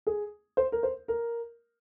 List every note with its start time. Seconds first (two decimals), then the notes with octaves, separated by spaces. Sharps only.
0.07 G#4
0.57 C5
0.72 A#4
0.83 C5
1.08 A#4